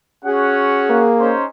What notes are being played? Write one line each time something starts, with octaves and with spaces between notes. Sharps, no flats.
C#4 F#4 G#4 F#5
A#3
C#4 D#4 C5